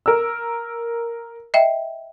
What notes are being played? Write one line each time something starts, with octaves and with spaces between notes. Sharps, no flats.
A#4 E6
D#5 E5 G5